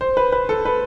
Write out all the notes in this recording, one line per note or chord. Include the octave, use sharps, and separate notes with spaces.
C5
B4
B4
A4
B4